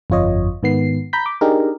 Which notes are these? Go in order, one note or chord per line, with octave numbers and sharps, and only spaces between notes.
G1 F2 F4 C#5 D#5
G#2 D#3 B3 C7
A#5 B5 G6 B6
D6
D4 D#4 G4 G#4 A#4